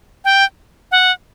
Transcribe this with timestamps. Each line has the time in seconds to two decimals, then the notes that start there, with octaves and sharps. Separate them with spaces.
0.25 G5
0.91 F#5